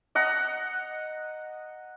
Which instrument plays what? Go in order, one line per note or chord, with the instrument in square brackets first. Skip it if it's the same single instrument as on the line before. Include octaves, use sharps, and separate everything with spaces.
[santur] D#5 F#5 A#5